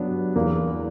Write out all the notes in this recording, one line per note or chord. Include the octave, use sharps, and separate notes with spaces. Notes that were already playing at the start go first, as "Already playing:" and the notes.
Already playing: G2 F#3 B3 D4
E2 A#3